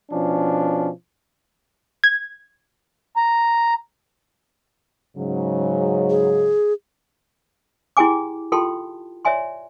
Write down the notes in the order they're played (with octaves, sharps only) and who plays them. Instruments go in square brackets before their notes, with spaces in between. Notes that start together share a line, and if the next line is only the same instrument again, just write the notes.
[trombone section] B2 F3 C#4 D4
[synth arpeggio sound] G#6
[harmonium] A#5
[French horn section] G#2 C#3 F#3
[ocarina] G#4
[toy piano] E4 G4 G#4 G5 G#5 D6
F4 G4 A4 G5 A5 C6
C#5 D5 E5 G#5 C6